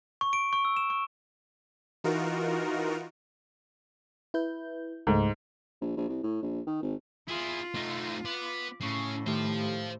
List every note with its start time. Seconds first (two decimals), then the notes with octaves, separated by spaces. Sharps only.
0.21 C#6
0.33 D7
0.53 C#6
0.65 E6
0.77 E7
0.90 C#6
2.04 E3 D#4 F4 F#4 A#4
4.34 E4 B4 G6
5.07 C#2 G#2 A3
5.81 A#1
5.97 A#1
6.09 C2
6.23 A2
6.42 A#1
6.67 D#3
6.82 G#1
7.28 E4 F4 G#4
7.74 A3 D#4
8.25 B3 D6
8.81 A2 C#3 C#6 C7
9.27 D#3 A3 G4 C5 F5